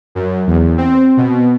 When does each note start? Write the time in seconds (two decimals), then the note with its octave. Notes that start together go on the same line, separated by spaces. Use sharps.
0.15 F#2
0.47 E2
0.77 C4
1.17 B2